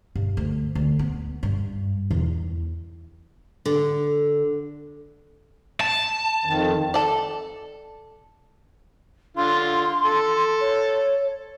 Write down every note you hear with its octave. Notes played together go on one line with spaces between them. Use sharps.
G2
D2
D2
B3
G2
E2
D3
A5
F2 D#3
A4 D5
D3 F4 C6
A4
C#5